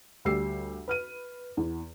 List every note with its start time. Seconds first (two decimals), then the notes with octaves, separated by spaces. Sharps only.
0.25 D2 G3 G4 E6 C7
0.88 B4 F6 D#7
1.57 E2